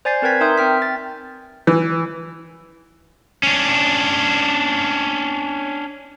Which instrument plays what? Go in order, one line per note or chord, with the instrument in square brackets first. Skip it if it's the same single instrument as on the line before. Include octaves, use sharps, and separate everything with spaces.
[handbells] C5 D5 G#5 G6 A6 C7
C4 A#4 B4 G5 G#6 B6
D#4 A#4 E5 C6 D#6 G6
C4 G5 F6 B6
A6
[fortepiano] E3
[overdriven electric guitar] C#4 D4